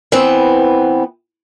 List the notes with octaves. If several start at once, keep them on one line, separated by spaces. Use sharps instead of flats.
E3 B3 C4